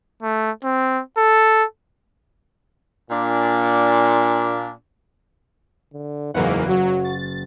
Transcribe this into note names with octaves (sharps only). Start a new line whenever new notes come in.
A3
C4
A4
A#2 D4
D3
F#1 E2 G#2 E3 A#3 A#4 F#5
F#3 F#4
A6